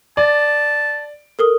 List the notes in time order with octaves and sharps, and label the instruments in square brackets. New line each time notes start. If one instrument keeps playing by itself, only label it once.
[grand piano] D5 [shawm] A5
[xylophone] A4 A#4 D#6